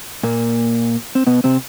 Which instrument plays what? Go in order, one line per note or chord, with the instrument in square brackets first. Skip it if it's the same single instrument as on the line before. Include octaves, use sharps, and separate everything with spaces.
[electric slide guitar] A#2 A#3
C4
B2 B3
C3 C4